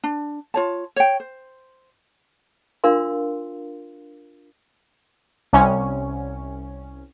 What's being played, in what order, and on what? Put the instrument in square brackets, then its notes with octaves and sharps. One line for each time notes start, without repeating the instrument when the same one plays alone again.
[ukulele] D4
F4 C#5 A5
C#5 G5
C5
[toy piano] D4 F4 A#4 F5 C6
[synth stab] C2 C#4